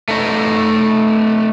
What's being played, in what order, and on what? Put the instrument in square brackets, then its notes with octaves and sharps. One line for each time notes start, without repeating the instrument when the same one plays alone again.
[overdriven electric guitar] A3 D#4